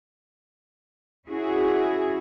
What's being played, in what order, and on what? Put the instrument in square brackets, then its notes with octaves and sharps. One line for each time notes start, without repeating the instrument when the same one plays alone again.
[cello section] C#4 E4 F#4 G#4